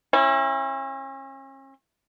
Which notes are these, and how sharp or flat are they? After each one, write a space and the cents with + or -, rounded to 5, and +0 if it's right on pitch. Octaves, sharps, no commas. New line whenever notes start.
C#4 -40 E4 +0